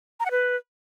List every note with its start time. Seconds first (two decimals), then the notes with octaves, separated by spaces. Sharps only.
0.20 A#5
0.25 F#5
0.31 B4